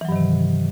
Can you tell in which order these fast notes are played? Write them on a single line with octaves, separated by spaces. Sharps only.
E3 F#3 G2 D#3 C3